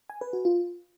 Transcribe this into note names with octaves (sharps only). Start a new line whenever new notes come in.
G#5
B4
F#4
F4